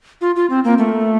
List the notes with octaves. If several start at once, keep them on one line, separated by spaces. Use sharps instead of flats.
F4
F4
C4
A#3
A3